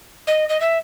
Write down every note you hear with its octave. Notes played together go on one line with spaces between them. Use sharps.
D#5
D#5
E5